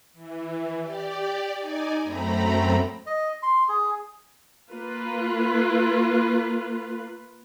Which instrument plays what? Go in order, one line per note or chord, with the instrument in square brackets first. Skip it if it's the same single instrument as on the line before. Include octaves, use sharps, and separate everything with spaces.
[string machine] E3
G4 D5
D#4 D5 G#5
F#2 A3 C4 A#5 B5
[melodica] D#5
C6
G#4
[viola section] A#3 F4 B4